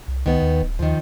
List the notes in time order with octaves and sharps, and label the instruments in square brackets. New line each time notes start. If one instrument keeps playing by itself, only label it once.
[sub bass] C2
[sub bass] C#2 [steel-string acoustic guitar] D#3 B3
[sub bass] D#2
D1
[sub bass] D#2 [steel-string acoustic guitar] D#3 F3